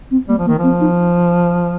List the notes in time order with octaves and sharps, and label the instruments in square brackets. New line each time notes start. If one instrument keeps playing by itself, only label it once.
[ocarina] C4
[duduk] G3 [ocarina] A#3
[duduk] F3
[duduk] D#3 [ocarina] A#3
[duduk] F3 [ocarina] C4
[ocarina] D#4